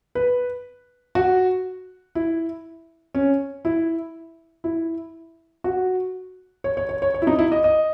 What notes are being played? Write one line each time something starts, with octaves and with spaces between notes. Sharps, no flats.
B4
F#4
E4
C#4
E4
E4
F#4
C#5
C#5
C#5
C#5
C#5
E4
D#4
E4
D#5
D#5